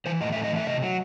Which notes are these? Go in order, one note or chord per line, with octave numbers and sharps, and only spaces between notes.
E3 C5
A2 D#5
A3 E5
D#5
E3 E5
C3 D#5
F#3